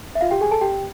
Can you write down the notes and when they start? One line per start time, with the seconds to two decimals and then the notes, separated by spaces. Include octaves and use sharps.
0.15 E5
0.21 F4 F5
0.31 G4 G5
0.41 G#4 G#5
0.51 A4 A5
0.61 G4 G5